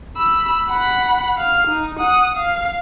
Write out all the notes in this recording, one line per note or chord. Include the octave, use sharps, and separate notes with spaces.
B5 E6
F#5 B5
F5 F6
D#4
F#5 D#6
F5